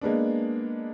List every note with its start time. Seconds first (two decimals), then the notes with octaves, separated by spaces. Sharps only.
0.01 G#3 A#3 B3 D4